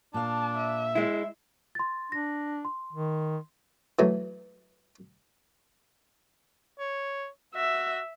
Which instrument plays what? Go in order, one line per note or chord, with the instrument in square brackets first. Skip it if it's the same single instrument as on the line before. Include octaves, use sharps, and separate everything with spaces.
[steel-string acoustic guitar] A#2 F5 [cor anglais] D4 [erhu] A5
[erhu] E5
[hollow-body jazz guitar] G#3 E4
[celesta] C6 A6
[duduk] D4 [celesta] A#6
[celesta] C6
[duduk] D#3
[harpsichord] E3 F#3 A3
[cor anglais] C#5
[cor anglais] F#4 [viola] E5